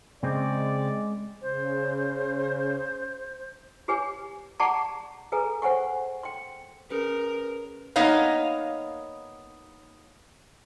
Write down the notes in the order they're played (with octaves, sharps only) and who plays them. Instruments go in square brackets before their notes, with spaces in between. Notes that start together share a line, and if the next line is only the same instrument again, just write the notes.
[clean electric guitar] C#3 C4 [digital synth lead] G#3 [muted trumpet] D5
[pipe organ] C#3 [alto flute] C5
[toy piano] G4 G#4 B4 C#5 G#5
G#4 D5 F#5 A5 A#5 C#6
G#4 A4 B4 G#5 A#5
C5 F#5 G#5 C#6
G5 C6
[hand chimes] C#4 G#4 B4 [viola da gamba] A#4
[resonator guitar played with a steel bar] A#3 B3 D#4 C#5 D#5 F5